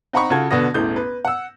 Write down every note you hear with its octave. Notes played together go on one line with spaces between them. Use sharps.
C4 D#4 F#5 A#5 B5 C#6
C#3 F4 F#4 A4 G#6
B2 D3 B3 D#6 A#6
E1 A1 A2 E3 A3 G6
B4
F#5 E6